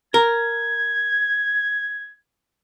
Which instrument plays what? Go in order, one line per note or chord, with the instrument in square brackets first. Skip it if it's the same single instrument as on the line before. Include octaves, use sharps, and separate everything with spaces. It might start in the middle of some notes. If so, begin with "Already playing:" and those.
[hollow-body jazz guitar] A#4 [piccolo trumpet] G#6